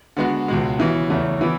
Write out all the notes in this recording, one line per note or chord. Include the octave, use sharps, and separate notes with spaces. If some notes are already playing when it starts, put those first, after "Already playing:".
D3 G#3 B3 F#4
C#2 B2 G#3
C#3 E3 B3 F#4
E2 C#3 E3 A3
E3 B3 E4